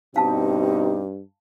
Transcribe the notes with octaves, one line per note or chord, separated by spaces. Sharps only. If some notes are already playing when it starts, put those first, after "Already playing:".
G2 B2 C4 D#4 G4 F5 A5